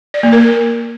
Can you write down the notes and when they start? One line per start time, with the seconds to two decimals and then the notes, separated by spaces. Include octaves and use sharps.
0.14 D5
0.23 A#3
0.32 A#4